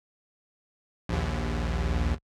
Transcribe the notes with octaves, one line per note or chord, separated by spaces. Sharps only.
A#1 D#2